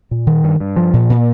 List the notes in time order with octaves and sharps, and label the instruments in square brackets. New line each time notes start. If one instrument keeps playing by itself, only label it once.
[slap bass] A#2
D#3
G2
G2
F3
A#2
A#2